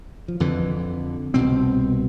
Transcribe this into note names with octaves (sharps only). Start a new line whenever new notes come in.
F3
F2 D3 E3
C2 B2 C4